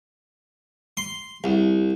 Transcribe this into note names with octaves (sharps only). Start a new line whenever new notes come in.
C6
C2